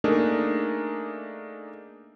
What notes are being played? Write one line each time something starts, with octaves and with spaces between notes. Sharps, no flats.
A3 A#3 D4 D#4 G#4 A#4